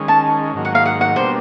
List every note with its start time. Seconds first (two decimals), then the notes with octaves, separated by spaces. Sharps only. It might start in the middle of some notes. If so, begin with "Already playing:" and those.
Already playing: D#3 G#3 C#4
0.08 A5
0.54 G#2 D#3 F#3 A#3
0.65 F#5
0.75 F5
0.86 F#5
1.01 F#5
1.16 B2 G3 A#3 D4 C5